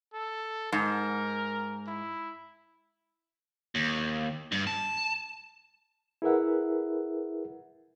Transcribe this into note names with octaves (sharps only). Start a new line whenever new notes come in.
A4
G#2 A#4
E4
D#2
G2
A5
E4 G#4 A#4 B4 E5 F#5